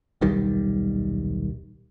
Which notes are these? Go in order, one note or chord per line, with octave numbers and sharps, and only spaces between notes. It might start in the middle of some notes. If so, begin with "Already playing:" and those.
D#1 B1 D#3 G3